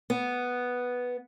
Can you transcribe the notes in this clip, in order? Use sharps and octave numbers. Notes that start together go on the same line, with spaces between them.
B3